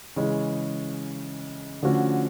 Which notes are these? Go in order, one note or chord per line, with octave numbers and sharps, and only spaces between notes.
C#3 E3 G#3 C#4
D3 F3 A3 C#4 F#4